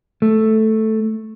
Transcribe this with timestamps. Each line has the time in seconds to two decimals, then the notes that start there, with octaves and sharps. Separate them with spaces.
0.22 A3